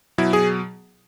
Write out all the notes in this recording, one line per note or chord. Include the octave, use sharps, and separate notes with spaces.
B2 F#3 E4
G#4